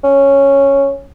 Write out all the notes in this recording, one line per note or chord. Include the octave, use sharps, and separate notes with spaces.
C#4